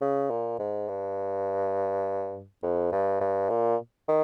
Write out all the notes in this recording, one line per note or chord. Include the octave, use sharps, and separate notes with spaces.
C#3
A#2
G#2
G2
F2
G2
G2
A#2
D#3